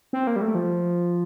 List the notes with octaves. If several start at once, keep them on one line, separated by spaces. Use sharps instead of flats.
C4
A#3
G3
A3
F3